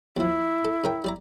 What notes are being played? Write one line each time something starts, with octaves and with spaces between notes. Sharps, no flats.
D#2 F3 E4
A4
C#3 A#4 G5
G3 D5 A#5